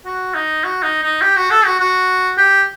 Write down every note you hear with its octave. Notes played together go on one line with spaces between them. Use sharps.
F#4
D#4
F#4
D#4
D#4
G4
F#4
A4
F#4
F#4
G4